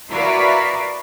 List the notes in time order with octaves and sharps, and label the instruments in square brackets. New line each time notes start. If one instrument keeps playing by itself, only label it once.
[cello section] E4 F#4 A#4 B4 D5 F5